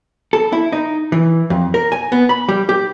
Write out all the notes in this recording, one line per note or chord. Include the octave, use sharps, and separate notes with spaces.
A4
E4
D#4
E3
F2
A#4
G#5
B3
B5
G3
G4